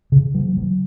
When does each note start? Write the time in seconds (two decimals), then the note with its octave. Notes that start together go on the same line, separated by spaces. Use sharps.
0.12 C#3
0.34 F#3
0.57 F#3